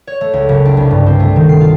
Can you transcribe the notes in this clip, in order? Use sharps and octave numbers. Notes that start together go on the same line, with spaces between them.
C#5
A3
C#2
F#1
D4
C2
G2
C4
A3
D#3
C7
F4